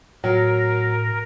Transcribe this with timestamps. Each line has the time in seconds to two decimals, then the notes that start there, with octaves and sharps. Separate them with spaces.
0.24 A2 F#3 A#4